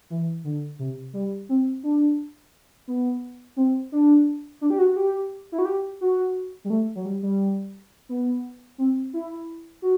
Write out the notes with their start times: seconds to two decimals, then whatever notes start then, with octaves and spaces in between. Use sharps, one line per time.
0.10 E3
0.44 D3
0.79 C3
1.13 G3
1.49 C4
1.83 D4
2.88 B3
3.56 C4
3.92 D4
4.61 D4
4.70 G4
4.79 F#4
4.96 G4
5.52 E4
5.59 F#4
5.65 G4
6.01 F#4
6.65 G3
6.70 A3
6.95 F#3
7.05 G3
7.23 G3
8.09 B3
8.78 C4
9.13 E4
9.82 F#4